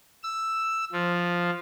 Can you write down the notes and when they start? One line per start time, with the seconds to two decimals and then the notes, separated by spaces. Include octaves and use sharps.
0.23 E6
0.93 F3